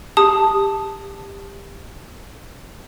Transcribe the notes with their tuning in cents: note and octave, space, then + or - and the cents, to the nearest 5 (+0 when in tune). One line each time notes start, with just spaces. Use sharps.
G4 +20 A5 +0 D#6 +0